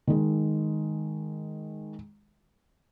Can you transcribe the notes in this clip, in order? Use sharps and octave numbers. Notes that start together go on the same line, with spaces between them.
D#3 G#3